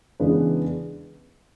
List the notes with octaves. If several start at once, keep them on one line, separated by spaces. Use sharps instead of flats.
C#3 E3 G#3 B3 D4 B4